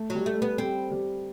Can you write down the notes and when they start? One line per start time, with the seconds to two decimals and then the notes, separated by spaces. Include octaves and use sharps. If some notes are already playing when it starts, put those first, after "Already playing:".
Already playing: A3
0.10 F#3 G3
0.26 A3
0.42 B3
0.58 G3 C4
0.91 G3